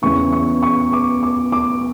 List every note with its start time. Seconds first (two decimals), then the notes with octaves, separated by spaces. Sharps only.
0.02 E2 C#3 E3 B3 C#6
0.32 C#6
0.63 C#6
0.93 D6
1.23 D6
1.52 D6